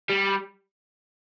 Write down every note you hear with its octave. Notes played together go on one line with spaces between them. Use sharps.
G3